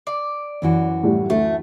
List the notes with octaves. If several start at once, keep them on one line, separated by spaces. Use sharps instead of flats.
D5
F#2 E3 F#4
A2 G3
D2 A3